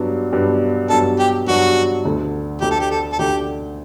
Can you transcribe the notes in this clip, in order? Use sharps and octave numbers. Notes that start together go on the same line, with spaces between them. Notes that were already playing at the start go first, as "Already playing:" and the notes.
Already playing: G2 F#3 B3 D4
G2 F#3 B3 D4
G2 F#3 B3 D4 A4
G4
G2 F#3 B3 D4 F#4
D2 D3 A3
D2 D3 A3 G4
A4
G4
A4
A4
D2 D3 A3 G4